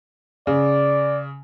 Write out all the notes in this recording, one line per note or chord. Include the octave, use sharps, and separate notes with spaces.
C#3 D5